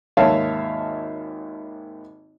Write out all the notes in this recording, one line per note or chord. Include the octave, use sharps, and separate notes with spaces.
G#1 D#2 C#5 E5 F5 A5